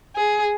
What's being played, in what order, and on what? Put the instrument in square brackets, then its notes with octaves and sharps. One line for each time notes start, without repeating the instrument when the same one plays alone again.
[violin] G#4